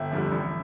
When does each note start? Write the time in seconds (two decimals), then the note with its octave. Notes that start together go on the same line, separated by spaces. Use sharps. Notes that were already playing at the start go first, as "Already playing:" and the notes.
Already playing: G1 E5 G5
0.12 F2 D3 G3
0.32 A1